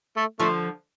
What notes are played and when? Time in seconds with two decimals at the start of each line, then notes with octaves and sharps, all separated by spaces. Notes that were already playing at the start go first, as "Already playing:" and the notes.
0.16 A3
0.39 D3 F3 A3